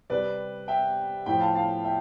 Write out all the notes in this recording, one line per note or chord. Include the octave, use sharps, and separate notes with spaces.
C3 G3 B4 D5
E5 G5
A2 F3 G5 B5
F5 A5
F5 A5
E5 G5